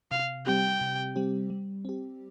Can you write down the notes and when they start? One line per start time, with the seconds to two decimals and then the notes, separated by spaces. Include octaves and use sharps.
0.11 C3 F5
0.46 G3 C4 G4 G5
0.81 C3
1.16 G3 C4 G4
1.50 G3
1.85 C4 G4